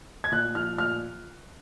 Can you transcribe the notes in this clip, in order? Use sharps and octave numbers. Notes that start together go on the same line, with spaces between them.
G#6
A#2 F#6
F3 F6
A#2 F6